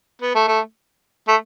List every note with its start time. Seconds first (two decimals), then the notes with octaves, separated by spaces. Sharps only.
0.22 B3
0.35 A3
0.48 A3
1.28 A3